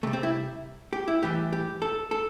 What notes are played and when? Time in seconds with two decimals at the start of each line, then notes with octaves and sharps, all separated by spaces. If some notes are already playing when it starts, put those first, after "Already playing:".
0.03 C3 G3 A3
0.13 C4
0.23 E4
0.93 G4
1.08 E4
1.22 A2 E3 G3 G4
1.53 G4
1.82 A4
2.11 A4